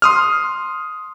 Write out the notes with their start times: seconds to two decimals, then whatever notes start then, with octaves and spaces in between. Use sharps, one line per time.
0.02 C6 D#6 F6